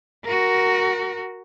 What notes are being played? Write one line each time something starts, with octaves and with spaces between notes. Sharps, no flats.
F#4 A#4